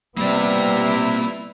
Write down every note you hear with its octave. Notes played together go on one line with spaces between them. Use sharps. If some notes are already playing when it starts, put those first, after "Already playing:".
C3 G3 A#3 B3 E4 D5